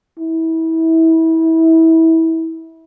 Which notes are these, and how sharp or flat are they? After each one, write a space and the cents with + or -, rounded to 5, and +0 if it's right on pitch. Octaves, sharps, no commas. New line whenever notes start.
E4 -25